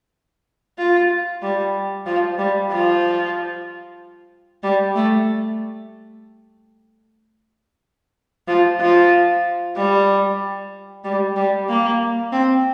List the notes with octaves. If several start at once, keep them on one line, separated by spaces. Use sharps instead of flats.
F4
G3
F3
G3
F3
G3
A3
F3
F3
G3
G3
G3
A#3
C4